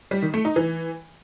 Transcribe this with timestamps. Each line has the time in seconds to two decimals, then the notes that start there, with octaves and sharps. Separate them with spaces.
0.11 G3
0.22 D#3
0.34 A3
0.45 D#4
0.56 E3